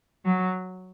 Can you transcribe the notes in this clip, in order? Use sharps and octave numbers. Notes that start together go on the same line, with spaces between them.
F#3